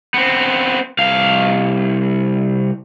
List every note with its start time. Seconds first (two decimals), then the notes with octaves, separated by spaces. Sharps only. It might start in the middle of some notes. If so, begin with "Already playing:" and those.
0.14 B3 C4
0.99 C2 F5